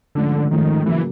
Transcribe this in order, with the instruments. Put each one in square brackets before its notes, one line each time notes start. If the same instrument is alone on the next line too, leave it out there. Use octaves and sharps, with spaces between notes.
[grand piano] G#2 F3 A3 C#4 [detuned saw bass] D3
[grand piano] G#2 F3 A3 C#4 [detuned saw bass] D#3
[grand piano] C#3 F#3 A#3 [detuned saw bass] E3